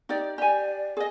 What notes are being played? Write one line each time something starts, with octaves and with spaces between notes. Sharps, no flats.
D#4 G4 D5
G4 D5 G#5
G#4 D#5